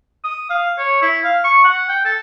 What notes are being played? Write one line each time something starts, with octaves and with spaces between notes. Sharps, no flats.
D#6
F5
C#5
E4
F5
C#6
F#5
G5
A4